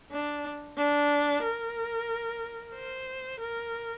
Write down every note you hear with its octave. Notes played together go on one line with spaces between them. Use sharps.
D4
D4
A#4
C5
A#4